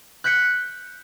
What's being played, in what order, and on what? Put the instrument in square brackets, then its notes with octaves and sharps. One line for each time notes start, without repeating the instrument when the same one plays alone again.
[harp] F#6 G6 B6 C#7